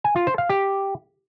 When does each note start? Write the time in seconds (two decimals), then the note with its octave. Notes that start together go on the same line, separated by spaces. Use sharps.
0.04 G#5
0.16 F4
0.27 C5
0.38 F5
0.49 G4